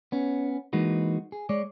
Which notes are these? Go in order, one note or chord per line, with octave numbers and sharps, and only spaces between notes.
B3 C#4
E3 G#3 A#3 D#4 F#4 B4
G#4
G#3 C#5 D5